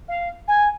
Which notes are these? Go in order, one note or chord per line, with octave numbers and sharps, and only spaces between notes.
F5
G#5